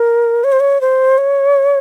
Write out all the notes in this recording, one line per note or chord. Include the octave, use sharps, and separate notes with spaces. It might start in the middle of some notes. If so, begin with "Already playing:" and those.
Already playing: A#4
C#5
C5
C#5
C5
C#5